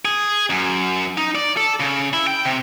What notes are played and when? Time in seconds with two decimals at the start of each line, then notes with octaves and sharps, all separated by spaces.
0.05 G#4
0.50 F#2
1.18 D#4
1.35 D5
1.57 A4
1.80 C#3
2.13 E4
2.27 G5
2.45 C3